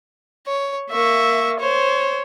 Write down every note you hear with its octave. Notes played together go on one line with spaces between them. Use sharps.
C#5
A#3 E5 C#6
C5 C#5